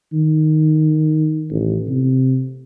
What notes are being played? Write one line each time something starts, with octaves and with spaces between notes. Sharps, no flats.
D#3
A1
C3